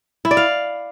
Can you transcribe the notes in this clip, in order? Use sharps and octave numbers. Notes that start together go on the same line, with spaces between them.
E4
D5
F5